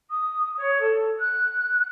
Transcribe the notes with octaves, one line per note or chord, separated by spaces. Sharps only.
D#6
C#5
A4
F#6